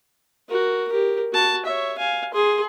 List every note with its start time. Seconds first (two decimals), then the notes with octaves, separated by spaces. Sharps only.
0.48 F#4 A#4
0.88 G4 A#4
1.32 F#4 A5
1.65 C#5 E5
1.98 F5 G#5
2.33 G#4 C6